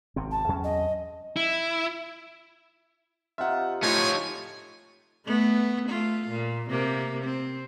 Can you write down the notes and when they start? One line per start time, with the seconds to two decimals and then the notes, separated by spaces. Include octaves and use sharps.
0.16 G#1 C3 C4
0.31 A5
0.49 E2 F#3 C#4
0.63 D#5
1.37 E4
3.38 C3 D#4 F4 E5 F#5
3.83 A2 F3 A3 D#4 F4 C#5 G#5
5.26 A3 B3
5.89 A3 F4
6.30 A#2
6.70 C3 A#3
7.25 C4